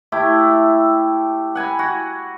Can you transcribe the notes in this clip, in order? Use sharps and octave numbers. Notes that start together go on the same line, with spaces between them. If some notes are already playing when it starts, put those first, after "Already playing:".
A3 E4 G4
F#5 G#5 A#5 B5
F#4